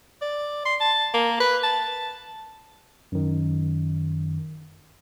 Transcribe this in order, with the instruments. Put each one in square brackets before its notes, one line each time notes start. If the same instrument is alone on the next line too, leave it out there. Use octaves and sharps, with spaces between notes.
[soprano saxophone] D5
C6
A5
A#3
B4
A5
[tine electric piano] F#2 D#3